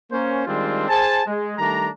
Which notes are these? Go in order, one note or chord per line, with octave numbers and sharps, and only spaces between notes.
A#3 C#4 C5
D#3 G3 G#3 C4 D4 F4
G#4 C5 G#5 A5
G#3
D#3 G3 A3 D4 A#5